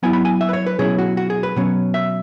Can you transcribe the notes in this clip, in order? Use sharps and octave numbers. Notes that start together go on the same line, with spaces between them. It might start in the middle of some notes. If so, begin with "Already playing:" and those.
F#3 B3 E4 G#5
B5
G#5
E5
B4
C#5
B4
B2 F#3 C#4 E4 G#4
F#4
F#4
G#4
B4
B2 F#3 C#4
E5